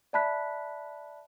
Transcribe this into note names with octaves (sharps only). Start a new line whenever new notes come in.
D5 E5 A5 B5 F#6 B6